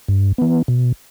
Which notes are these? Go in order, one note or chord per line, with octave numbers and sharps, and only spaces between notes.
G2
E3 B3
B2